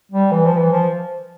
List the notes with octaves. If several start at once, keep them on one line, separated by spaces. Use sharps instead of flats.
G3
E3
F3
E3
F3